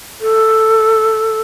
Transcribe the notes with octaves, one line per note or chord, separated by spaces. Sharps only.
A4